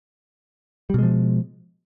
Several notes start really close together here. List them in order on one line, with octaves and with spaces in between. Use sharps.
G3 B2 G#3 F3